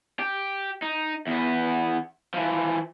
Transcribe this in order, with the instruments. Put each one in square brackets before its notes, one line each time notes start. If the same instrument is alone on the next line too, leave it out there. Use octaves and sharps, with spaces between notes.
[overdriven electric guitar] G4
D#4
E2 B3
E3 F3